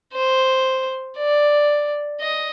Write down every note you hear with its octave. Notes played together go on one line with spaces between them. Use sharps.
C5
D5
D#5